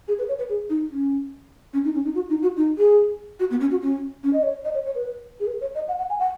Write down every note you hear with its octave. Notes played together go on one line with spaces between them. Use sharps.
G#4
B4
C#5
B4
G#4
D#4
C#4
C#4
D#4
C#4
D#4
F#4
D#4
F#4
D#4
G#4
F#4
B3
C#4
F#4
C#4
C#4
D#5
C#5
D#5
C#5
C#5
B4
G#4
B4
C#5
D#5
F#5
F#5
G#5
F#5